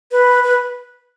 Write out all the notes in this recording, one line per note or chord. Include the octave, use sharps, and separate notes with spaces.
B4
B4